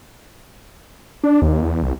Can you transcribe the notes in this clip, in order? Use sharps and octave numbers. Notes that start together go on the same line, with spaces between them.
D4
D#2
E2
C2